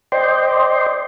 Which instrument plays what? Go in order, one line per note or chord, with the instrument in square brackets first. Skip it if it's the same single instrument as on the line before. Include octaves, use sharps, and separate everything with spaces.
[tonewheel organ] C5 D5 D#5 G5 C6